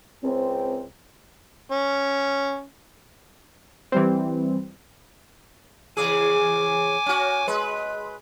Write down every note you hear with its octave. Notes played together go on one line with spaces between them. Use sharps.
C#2 C4
C#4
E3 G3 C4
E2 C#3 G#4 G#5 D6
C#4 F#4
G#3 B4